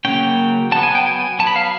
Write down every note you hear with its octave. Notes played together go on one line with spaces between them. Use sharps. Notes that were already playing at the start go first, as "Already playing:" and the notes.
C#3 F#3 A#3 C#4 G5
F#3 B3 A5
G#5
G5
G#5
F#3 B3 A5
B5
F5